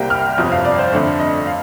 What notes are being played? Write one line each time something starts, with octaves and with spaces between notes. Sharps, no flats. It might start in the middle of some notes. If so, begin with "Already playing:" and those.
Already playing: C2 C3 G3 A#3 G5
F6
G1 F2 C3 F3 D#6
F5
D5
C5
F2 D3 A3
D#5
F5